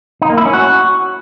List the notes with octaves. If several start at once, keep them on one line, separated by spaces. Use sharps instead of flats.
D#4
A#3
E4
C#4
F#4